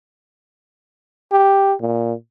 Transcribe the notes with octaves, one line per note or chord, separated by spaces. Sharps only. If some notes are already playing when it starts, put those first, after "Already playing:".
G4
A#2